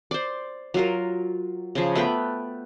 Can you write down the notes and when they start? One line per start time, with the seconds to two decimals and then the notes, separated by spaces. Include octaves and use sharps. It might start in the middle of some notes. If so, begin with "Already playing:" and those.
0.11 C5 D5
0.74 F#3 F4 A#4
1.75 C#3 F3
1.95 A3 B3 B4 G5